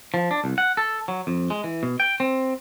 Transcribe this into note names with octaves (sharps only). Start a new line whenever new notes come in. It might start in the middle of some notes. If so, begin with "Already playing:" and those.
F3
D4
C2
F#5
A4
F#3
F2
G#3
E3
B2
G5
C4